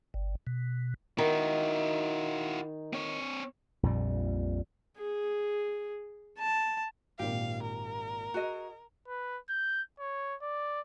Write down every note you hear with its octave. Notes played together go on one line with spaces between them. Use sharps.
G1
B2
D#3 E4 F#4
C4 C#5
A#1 F2 A#2 G3
G#4
A5
G#1 A#2 G4 F5
A#4
F#4 G#4 D#5
B4
G6
C#5
D5